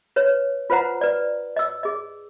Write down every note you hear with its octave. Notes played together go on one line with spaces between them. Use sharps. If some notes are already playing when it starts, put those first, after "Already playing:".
B4 C#5
F4 B4 C5 F#5 A#5
B4 D5
D#5 E6
G#4 D#5